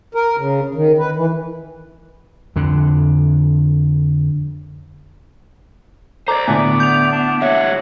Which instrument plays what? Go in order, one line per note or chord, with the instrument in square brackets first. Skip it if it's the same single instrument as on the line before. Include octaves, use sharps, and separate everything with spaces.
[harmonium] A#4
C#3
D#3
B4
E3
[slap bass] F2 D3
[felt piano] A4 [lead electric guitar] C5 D5 [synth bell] A#5 D6
[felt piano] A2 D3 A3 [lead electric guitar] B3 [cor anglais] D5 [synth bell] G#5
[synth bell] G6 F7
[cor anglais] D4
[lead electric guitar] G3 C#5 [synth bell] E5 [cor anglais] F#5